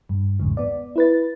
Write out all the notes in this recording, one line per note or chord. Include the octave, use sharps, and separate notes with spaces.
G2
A#1 E2 G#2 C#3
B3 D5
E4 B4 A6